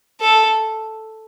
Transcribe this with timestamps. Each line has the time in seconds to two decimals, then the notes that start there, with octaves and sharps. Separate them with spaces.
0.21 A4